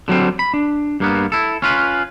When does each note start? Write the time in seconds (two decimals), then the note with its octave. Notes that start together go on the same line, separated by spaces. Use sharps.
0.08 D3 F#3 G3 C4
0.39 B5
0.54 D4
1.00 G2 A#3 B3
1.32 E4 A4
1.62 C#4 F4 B4